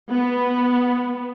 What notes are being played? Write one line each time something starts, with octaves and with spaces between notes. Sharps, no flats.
B3